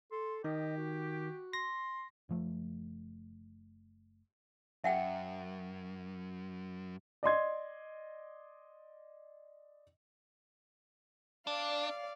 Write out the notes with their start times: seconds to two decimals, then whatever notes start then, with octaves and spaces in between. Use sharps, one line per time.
0.12 A4 C6
0.44 D#3 G4 D#5
0.77 F#4
1.53 C6 A#6
2.29 F#1 F3 A3
4.84 F#2 E5 F#5 G5
7.23 D5 D#5 C6 G#6
11.47 D4 D5 F5